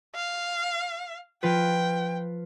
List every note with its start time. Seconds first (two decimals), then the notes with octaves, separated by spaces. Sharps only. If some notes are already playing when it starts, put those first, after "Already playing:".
0.15 F5
1.43 F3 F4 B4 G5